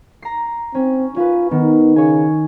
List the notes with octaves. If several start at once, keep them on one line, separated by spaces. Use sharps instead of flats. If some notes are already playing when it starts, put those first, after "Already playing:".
A#5 C7
C4 C#4
C#4 F4 B4
D#3 B3
C#3 C#5 G#5